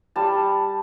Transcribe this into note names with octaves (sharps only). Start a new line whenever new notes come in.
G3 A5